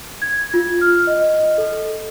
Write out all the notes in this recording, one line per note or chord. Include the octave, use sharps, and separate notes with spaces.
G#6
F4
F6
D#5
A4